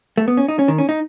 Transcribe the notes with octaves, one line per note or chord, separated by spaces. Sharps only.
A3
B3
C#4
D#4
C#4
D#3
C#4
D#4